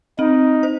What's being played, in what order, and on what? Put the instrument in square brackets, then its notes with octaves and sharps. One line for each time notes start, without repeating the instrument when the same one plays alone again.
[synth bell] C4 [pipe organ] D#4
[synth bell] C5